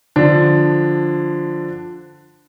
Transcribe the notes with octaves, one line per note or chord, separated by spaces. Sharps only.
D3 F3 D4